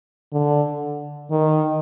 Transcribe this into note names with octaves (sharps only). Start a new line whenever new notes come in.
D3
D#3